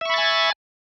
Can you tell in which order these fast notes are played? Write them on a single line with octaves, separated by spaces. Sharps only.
E5 C#6 B5 A6 G#5